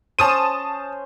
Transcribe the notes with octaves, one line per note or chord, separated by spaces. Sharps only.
C#4 C5 A5 D#6 D#7